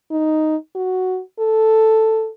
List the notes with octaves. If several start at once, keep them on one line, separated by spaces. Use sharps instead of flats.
D#4
F#4
A4